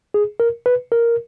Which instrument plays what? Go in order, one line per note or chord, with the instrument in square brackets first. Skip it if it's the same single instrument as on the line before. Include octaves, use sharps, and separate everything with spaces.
[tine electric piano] G#4
A#4
B4
A#4